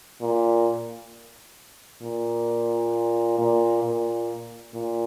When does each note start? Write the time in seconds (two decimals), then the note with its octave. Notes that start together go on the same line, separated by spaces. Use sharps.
0.21 A#2
2.02 A#2
3.39 A#2
3.83 A#2
4.74 A#2